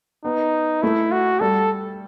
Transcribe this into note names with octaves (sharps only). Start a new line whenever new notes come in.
B3 D#4
A3 E4
F#4
G3 A4